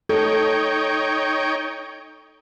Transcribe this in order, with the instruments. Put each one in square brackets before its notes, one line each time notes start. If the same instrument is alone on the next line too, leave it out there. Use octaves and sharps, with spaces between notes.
[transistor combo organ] D#4 C#5 G5 [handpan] A4